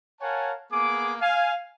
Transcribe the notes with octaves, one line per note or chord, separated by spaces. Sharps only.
A#4 C#5 F5 F#5 G#5 A5
A#3 B3 G#4 D6
F5 G#5